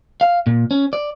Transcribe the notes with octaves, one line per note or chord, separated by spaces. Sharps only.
F5
A#2
C#4
D5